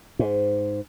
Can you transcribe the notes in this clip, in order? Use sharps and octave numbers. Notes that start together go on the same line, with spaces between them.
G#2